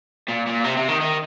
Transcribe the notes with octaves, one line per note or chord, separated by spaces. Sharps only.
A#2
A#2
C3
C3
D#3
D#3